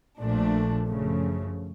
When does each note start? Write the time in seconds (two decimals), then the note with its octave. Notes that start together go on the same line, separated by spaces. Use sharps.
0.19 A#1 A#2 F3 A3 D4
0.88 F#2 C#3 F3 A3